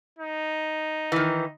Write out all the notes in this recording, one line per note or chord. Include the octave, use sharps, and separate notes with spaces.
D#4
D#3 E3